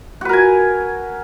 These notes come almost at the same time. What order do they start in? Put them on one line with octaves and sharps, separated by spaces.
F#4 B4 A#4 G#5